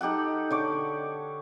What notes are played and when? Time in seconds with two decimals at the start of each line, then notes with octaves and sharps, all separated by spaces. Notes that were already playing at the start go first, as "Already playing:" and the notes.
0.01 D#4 G4 A4 F#5
0.51 D3 C#5 D6